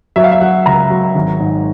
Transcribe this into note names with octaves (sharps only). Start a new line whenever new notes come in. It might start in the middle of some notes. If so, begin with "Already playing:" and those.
F#3 E5
F5
E5
F#3 F#5
C#2 A#5
F#3
G#1
G#2